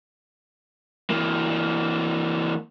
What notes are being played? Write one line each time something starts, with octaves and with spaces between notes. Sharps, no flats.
E3 A#3